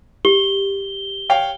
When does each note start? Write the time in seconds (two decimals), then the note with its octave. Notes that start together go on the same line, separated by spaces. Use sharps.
0.25 G4 G7
1.29 C#5 F5 G5